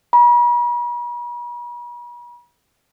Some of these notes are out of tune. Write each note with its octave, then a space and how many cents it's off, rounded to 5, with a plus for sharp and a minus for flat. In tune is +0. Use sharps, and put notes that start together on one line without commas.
B5 -45